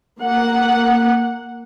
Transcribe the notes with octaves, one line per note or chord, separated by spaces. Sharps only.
A#3 F#5